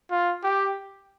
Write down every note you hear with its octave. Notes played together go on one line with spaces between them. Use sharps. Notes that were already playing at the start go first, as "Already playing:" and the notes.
F4
G4